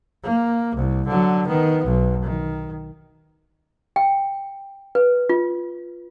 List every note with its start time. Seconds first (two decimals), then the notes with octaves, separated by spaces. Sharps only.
0.23 A#3
0.76 C2
1.08 D3 F#3
1.47 D#3 B3
1.85 B1
2.22 D#3
3.96 G5
4.95 B4
5.29 F4